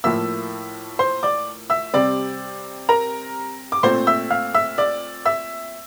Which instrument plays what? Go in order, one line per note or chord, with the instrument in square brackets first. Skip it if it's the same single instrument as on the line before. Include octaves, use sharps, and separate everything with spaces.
[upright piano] A2 F3 A#3 E5 E6
C5 C6
D5 D6
E5 E6
C3 G3 C4 D5 D6
A#4 A#5
D6
A#2 A3 C4 C5 C6
E5 E6
F5 F6
E5 E6
D5 D6
E5 E6